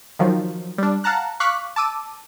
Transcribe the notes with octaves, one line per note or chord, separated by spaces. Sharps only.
D#3 F3 F#3
G3 D4
F5 F#5 A5 A#5 F#6
F5 C#6 D6 F#6 B6
A5 D6 E6 D#7